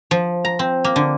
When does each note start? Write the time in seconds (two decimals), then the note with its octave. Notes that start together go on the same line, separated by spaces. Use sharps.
0.11 F3
0.45 A#5
0.59 C4
0.84 A#3
0.96 D3